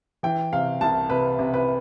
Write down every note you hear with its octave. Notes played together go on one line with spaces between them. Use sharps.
E3 G5
C3 F5
C2 A5
C3 B4
C3
B4